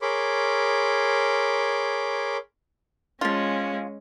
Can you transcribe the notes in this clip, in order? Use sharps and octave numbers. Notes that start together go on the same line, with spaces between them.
G#4 A#4 C#5 B5 C6 D6
F3 G#3 C#4 F4